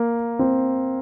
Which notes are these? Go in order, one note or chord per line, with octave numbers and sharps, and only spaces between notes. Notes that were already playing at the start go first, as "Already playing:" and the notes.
Already playing: A#3
C4